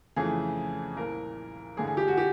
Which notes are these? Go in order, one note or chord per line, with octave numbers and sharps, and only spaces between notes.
F2 C#3 E3 A3 G#4
C2 A#2 F3 A#4
A1 G2 D3 G#4
G#4
G4
F#4
G4